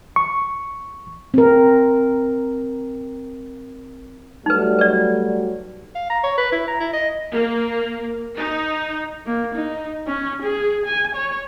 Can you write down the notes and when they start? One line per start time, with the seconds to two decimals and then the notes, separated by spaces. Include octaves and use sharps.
0.16 C#6
1.34 C4 A#4
4.46 F#3 G3 A3 D#4 B4
4.79 B4 D5
5.95 F5
6.10 A#5
6.24 C#5
6.38 B4
6.52 E4
6.68 A#5
6.80 E4
6.93 D#5
7.32 A#3
8.36 D#4
9.26 A#3
9.54 D#4
10.07 C#4
10.42 G#4
10.86 G#5
11.15 C#5